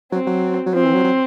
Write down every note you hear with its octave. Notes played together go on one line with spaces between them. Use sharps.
F#3 C4
F#3
F#3
F3 C4
E3
F#3
F#3